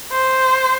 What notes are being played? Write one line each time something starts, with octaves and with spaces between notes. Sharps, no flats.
C5